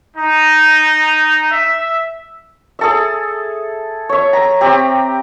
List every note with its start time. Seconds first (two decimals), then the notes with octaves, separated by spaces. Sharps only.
0.17 D#4
1.51 E5
2.79 G#4 A4 E5
4.09 C#5 E5
4.33 A#5
4.61 C4 G4 A#5